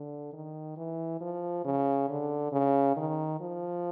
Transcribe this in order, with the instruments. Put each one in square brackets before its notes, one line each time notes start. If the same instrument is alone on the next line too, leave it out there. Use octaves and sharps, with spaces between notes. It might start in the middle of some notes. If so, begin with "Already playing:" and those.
Already playing: [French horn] D3
D#3
E3
F3
C#3
D3
C#3
D#3
F3